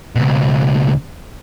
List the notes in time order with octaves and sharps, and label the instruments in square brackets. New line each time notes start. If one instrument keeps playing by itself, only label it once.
[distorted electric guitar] C#2 B2